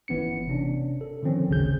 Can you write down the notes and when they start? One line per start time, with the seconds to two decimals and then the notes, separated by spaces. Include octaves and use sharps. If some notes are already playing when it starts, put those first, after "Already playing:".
0.08 G1 E3 B3 C#4 C#7
0.48 C3 C#4 D4
1.01 A4
1.23 D3 D#3 F3 C4 C#4
1.48 G#1 D2 C#3 C#4 G#4 G6